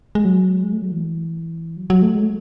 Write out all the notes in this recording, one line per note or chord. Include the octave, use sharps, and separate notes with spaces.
G#3
F#3
G#3
A3
F#3
E3
F#3
F#3
A3
G#3
A3